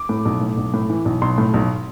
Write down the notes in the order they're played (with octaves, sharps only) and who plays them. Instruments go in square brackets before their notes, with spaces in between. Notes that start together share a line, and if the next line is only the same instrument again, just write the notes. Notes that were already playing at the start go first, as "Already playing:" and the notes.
Already playing: [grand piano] D6
A2
B1
A2
B1
A2
E3
B1
B1 C6
A2
B1